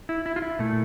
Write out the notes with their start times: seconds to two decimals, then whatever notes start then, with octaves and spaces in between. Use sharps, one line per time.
0.09 E4
0.26 E4
0.36 F4
0.42 E4
0.59 A#2 A3